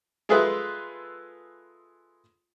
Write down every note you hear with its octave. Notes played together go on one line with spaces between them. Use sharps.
G#3 F4 G#4 A4 B4 E5